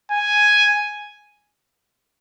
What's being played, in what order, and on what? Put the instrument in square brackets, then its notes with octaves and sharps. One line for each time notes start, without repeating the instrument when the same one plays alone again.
[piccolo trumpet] G#5